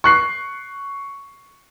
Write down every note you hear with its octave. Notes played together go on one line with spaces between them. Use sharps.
C#6 F#6 C7